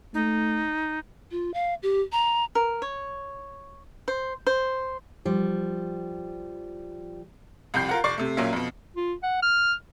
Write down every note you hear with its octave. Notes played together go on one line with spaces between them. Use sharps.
A3 D#4
F4
F5
G4
A#5
A#4
C#5
C5
C5
F3 G3
C2 F2 G4 G6 C7
F4 A#4 F#5
F1 D5 C#6 C7
C3 A3
A#1 A#2 F#3 A#3 C#4 E5
F2 B2
F4
F#5
F6